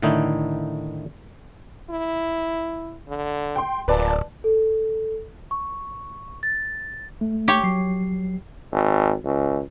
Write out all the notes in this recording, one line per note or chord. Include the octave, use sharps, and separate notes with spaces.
A2 D3 D#3 A3 D#4 E4
E4
D3
G5 C6
D1 A#2 B4 D5 A5
A4
C#6
A6
A3
G4 C#5
F#3 C7
G#1
C#2